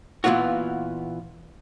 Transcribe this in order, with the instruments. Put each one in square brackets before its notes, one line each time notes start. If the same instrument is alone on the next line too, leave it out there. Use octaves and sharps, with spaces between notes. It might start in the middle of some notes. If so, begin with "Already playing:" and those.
[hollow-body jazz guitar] A#2 E3 B3 F4 F#4